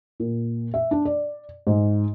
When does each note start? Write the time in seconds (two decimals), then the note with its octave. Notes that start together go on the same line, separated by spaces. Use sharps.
0.20 A#2
0.74 E5
0.91 D4
1.05 D5
1.67 G#2